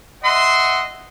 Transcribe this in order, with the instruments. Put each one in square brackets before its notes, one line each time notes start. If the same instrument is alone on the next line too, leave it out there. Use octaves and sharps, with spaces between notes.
[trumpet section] D#5 E5 F#5 C6